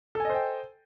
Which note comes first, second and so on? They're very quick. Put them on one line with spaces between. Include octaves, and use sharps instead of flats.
A4 G#5 D#5 C5 G5